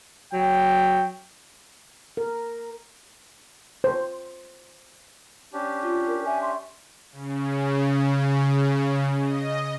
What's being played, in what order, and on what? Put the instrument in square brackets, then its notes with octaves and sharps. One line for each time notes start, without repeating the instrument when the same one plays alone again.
[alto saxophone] F#3 [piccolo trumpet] G5
[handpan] A#4
[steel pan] C5
[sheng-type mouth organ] C#4 D4 G4
[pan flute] F4
[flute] A#4
[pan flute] E5 [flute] G#5
[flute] C6
[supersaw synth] C#3
D#5